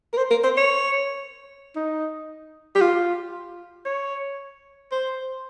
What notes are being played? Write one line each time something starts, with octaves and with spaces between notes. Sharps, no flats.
A#4
C5
A#4
C5
C#5
D#4
G4
F4
C#5
C5